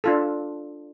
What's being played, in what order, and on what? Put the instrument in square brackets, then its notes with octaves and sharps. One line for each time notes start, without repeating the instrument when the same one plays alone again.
[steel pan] D4 F4 A4